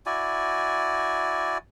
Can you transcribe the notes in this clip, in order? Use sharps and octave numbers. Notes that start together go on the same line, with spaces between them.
E4 F#4 D5 G#5